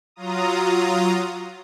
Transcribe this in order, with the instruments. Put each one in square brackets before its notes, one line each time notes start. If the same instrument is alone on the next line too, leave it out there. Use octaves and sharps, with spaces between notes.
[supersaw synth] F#3 F4 A#5 D#6